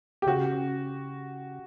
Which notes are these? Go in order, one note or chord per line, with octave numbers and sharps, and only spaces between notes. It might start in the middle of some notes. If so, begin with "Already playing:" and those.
G4
C#3 F#4